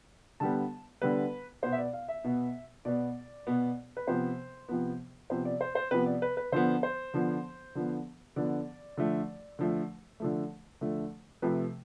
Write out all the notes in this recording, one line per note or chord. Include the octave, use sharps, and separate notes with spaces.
D3 G3 B3 A5
D3 G3 B3 B4
B2 B3 C5
E5
D5
F5
E5
B2 B3
B2 B3 D5
B2 B3
B4
C3 F3 B3 C5
C3 F3 B3
C3 F3 B3 C5
D5
C5
C5
C3 F3 B3 B4
D5
B4
B4
D3 F3 B3 C5
C5
D3 F3 B3
D3 F3 B3
D3 F3 B3 D5
D3 F3 A3
D3 F3 A3
D3 F3 A3
D3 F3 A3
C3 F3 A3 B4